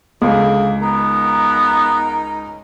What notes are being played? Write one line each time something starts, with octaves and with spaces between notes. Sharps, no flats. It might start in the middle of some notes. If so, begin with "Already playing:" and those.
C#2 D3 A#3 G#4
B3 D#4 A#4